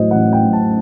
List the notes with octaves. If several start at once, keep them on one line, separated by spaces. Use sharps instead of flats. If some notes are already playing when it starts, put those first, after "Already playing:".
Already playing: A1 A2 F#3 C5 D#5
A1 F#5
G5
A2 F#3
A5